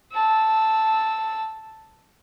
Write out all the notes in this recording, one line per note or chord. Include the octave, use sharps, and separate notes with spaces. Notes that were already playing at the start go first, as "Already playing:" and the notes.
A5 E6